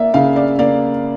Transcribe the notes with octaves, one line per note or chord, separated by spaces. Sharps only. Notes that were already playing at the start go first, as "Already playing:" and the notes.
Already playing: A#3 D5 E5
C#3 F5
D5
A#3 D5